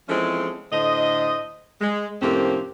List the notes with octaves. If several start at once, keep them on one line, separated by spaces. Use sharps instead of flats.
E3 F3 G#3 C4 C#4 A4
A2 D3 C5 D#5
G#3
F2 A2 C3 A#3 C4 C#4